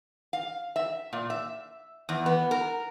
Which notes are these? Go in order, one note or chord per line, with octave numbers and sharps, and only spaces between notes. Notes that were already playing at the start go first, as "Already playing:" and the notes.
F5
E5
A#2
E5
E2
B3
A#4